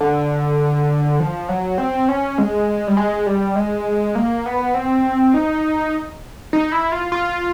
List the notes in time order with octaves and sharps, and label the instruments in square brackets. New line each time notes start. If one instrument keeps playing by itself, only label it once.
[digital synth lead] D3
F3
F#3
C4
C#4
G#3
G3
G#3
G3
G#3
A#3
B3
C4
D#4
D#4
E4
F4
F4